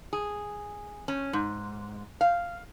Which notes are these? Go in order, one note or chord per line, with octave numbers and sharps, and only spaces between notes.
G#4
C#4
G#2
F5